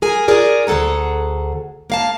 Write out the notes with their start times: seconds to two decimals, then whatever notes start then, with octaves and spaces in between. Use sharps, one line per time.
0.02 G#4 A#4 G#5
0.28 F4 G#4 A#4 D5
0.67 D2 G#4 A4 F#5 A#5
1.90 A#3 F5 A5